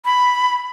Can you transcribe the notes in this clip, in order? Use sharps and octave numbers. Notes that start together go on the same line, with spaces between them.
B5